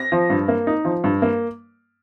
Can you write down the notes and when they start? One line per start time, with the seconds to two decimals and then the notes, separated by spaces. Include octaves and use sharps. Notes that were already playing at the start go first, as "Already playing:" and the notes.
Already playing: A#6
0.12 F3
0.30 G2
0.48 A#3
0.67 D#4
0.85 F3
1.04 G2
1.22 A#3